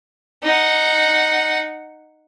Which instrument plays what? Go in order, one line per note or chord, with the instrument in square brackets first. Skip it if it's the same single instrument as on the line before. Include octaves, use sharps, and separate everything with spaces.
[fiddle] D#4 F#5